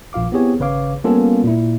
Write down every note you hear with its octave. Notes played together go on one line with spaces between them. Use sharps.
A#1 F4 F5 D6
B3 C4 E4 G4 G#4 C#5
G#1 C#3 B4 C#5 F5 D6
G3 A#3 B3 C#4 F4 A4
A#2 E4